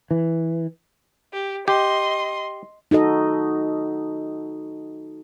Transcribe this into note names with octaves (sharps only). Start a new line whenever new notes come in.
E3
G4
G4 D#5 C6
D#4 F#4 A4 D#5